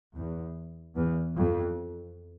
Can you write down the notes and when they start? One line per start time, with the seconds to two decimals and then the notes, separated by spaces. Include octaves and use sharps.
0.15 E2
0.96 E2
1.36 F2